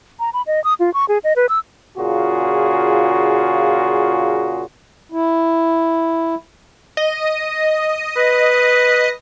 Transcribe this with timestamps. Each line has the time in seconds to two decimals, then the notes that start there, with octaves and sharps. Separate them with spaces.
0.20 A#5
0.33 B5
0.47 D#5
0.64 D#6
0.80 F4
0.94 C#6
1.09 G#4
1.24 D#5
1.36 B4
1.49 E6
1.97 A#2 C#3 F4 F#4 G#4
5.12 E4
6.97 D#5
8.17 B4